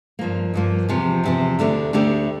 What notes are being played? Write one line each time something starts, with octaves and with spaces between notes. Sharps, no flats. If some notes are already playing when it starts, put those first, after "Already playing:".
G2 F3 A#3
G2 F3 A#3
E2 C3 F3
E2 C3 F3
D2 D3 A3 D4 G4
D2 D3 A3 D4 G4